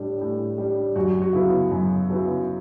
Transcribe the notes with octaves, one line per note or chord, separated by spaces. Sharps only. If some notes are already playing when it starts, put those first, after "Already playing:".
Already playing: A2 G3 D4
A2
G3 D4
F#2 F#4
F#4
C#3 F#3 B3 E4
F#2
C#3 F#3 B3 E4